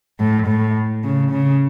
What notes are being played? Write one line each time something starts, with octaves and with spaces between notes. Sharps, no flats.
A2
A2
C#3
C#3